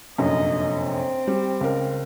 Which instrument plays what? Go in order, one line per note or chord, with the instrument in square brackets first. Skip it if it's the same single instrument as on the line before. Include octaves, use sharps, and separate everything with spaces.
[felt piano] F1 A#1 F#2 [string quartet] D#5
[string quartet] C4
[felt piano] G3
C#2 A#4